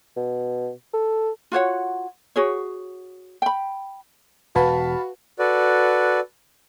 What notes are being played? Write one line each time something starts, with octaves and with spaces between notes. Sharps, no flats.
B2
A4
F4 F#4 C#5 F#5
F#4 G#4 C#5
G5 B5
E1 F#4 B4 F5 A5 B5
F#4 A4 B4 D5